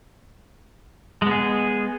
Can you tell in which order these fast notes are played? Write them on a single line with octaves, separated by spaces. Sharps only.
G#3 B3 G#4